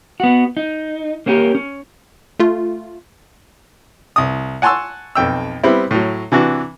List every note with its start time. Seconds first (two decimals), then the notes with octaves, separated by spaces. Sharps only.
0.20 B3 F#4
0.57 D#4
1.26 A#3 C4 C#4 F#4 G4 A#4
1.55 C#4
2.39 A3 F4
4.16 C2 D#6
4.62 F#5 G#5 A5 C6 C#6 E6
5.15 B1 F2 G5 E6
5.63 G3 B3 C4 E4
5.91 A2 F#3
6.32 C3 E3 D4 F#4